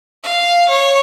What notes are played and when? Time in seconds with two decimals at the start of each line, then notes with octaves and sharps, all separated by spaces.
0.23 F5
0.69 C#5